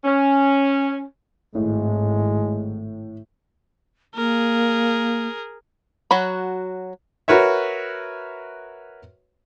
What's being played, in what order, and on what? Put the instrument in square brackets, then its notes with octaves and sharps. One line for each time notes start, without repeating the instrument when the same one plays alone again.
[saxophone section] C#4
[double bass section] G#1 [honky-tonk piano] A2 [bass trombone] G#3
[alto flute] A#3 [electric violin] G#4 A#4
[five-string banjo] F#3 F#4 B5
[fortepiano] F#4 A#4 B4 C#5 E5